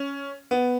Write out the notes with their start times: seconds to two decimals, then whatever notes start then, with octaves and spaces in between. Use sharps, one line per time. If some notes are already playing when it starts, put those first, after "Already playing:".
Already playing: C#4
0.51 B3